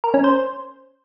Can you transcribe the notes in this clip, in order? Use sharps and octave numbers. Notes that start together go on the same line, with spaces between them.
A#4
C#4
C5